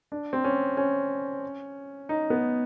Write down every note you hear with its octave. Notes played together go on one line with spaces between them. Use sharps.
D4
C4
C#4
C#4
D#4
B3